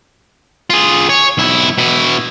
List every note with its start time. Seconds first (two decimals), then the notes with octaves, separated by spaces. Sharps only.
0.70 F4 G#4
1.09 C#5
1.38 B1 E4
1.78 B2 E4